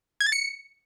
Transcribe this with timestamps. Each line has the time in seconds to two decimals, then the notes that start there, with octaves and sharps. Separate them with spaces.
0.20 G#6
0.26 A6
0.32 C#7